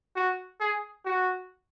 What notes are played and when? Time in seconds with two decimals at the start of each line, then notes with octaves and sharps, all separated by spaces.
0.16 F#4
0.60 G#4
1.05 F#4